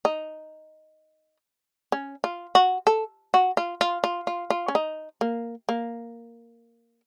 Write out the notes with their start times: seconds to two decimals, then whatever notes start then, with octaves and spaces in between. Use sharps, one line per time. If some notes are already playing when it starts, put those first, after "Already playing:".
0.05 D#4
1.92 C#4
2.24 F4
2.55 F#4
2.87 A4
3.34 F#4
3.57 F4
3.81 F4
4.04 F4
4.27 F4
4.50 F4
4.68 C#4
4.75 D#4
5.21 A#3
5.69 A#3